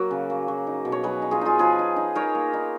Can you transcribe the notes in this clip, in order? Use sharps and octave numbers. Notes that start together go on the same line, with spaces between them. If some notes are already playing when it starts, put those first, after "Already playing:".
Already playing: F#3 A#3 F#4 A#4
C#3
A#3
F#3
D#4
B2
C#5
F#3 G#4 B4
D#4
F4 G#4
D#4 F4 G#4
F3 G#4 B4
D#4
D#4
D#4 A#4 C#5
A#3
D#4